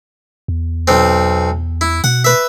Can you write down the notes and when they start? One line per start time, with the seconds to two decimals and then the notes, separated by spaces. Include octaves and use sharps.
0.48 E2
0.88 B1 C4
1.81 E4
2.04 B2 F#5
2.24 B4 E5